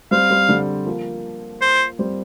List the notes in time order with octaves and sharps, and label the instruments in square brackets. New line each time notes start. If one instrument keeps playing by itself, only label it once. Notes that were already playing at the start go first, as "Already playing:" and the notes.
[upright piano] G3 C4 [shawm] F5
[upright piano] G3 C4
D3 G3
F3 A#3
[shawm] C5
[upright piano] G3 C4